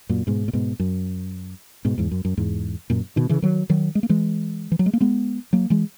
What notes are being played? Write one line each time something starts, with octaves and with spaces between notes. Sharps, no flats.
F#2 A#2
G#2 B2
A#2
G#2 B2
F#2
G#2 B2
E2 G#2
F#2
F#2
E2 G#2
F#2 A#2
B2 D#3
C#3 E3
D#3 F#3
D#3 F#3
G#3
A#3
E3 G#3
E3
F#3
G#3
A#3
G#3 B3
F#3 A#3
E3 G#3